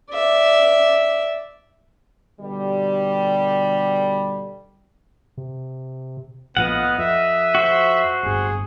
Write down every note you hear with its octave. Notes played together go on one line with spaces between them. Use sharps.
D5 E5
B2 D3 G3
C3
A#1 A2 F3 B3 D#5 F5 F#5
F2 E5
F#4 C5
D1 G1 G2 G#4